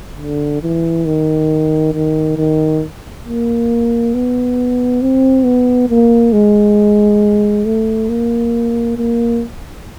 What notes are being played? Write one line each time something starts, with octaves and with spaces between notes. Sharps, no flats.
D3
E3
D#3
D#3
D#3
A#3
B3
C4
B3
A#3
G#3
A3
A#3
A#3